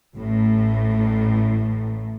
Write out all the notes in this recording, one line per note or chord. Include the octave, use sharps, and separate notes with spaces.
A1 A2